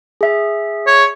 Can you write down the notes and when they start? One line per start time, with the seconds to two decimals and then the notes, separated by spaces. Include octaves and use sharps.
0.21 G#4 E5
0.87 C#5